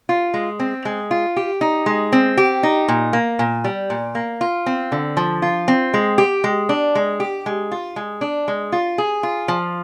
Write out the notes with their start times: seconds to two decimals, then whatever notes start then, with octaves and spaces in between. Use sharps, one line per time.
0.09 F4
0.34 G#3
0.60 C4
0.85 G#3
1.11 F4
1.36 G4
1.61 D#4
1.86 G#3
2.12 C4
2.37 G4
2.63 D#4
2.88 A#2
3.13 A#3
3.39 A#2
3.64 G3
3.90 A#2
4.15 A#3
4.41 F4
4.66 C4
4.92 D3
5.17 F3
5.42 F4
5.68 C4
5.94 G#3
6.18 G4
6.44 G#3
6.69 D4
6.95 G#3
7.20 G4
7.46 G#3
7.71 F4
7.96 G#3
8.21 D4
8.48 G#3
8.72 F4
8.98 G#4
9.23 F4
9.48 F3